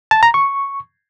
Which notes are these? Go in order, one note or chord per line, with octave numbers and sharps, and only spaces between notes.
A5
A#5
C#6